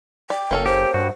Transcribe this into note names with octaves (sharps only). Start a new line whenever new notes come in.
D5 G5
F#1 A#3 C#4 A4
G4 C5
G2 F#4